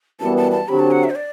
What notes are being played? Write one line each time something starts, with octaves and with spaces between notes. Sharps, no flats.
F#2 E3 G3 B3 A5
A5
A5
D3 F#3 C4 G4 B5
A5
F#5
E5
C5
D5